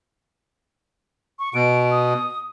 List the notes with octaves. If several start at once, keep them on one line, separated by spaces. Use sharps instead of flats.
C#6
B2 D7
D#6